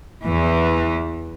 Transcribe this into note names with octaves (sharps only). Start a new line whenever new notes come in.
E2 E3